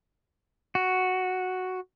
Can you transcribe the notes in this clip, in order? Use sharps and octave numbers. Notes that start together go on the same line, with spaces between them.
F#4